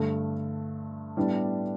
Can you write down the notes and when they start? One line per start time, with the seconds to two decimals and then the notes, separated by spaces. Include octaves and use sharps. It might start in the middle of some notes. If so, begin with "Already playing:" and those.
Already playing: G2 D3 A3
1.17 A2 G3 B3 D4